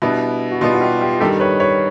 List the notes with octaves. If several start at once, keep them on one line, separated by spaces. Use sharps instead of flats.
B2 G3 B3 D4 E4
F#4
B2 G3 B3 D#4 F4
F#4
F4 G4
F4 G4
G2 D#3 G3 G4 A4
B4 C#5
B4 C#5